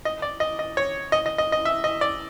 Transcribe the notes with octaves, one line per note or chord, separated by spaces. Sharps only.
D#5
D5
D#5
D#5
C#5
D#5
D#5
D#5
D#5
E5
D#5
D5